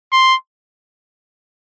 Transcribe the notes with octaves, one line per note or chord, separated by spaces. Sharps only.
C6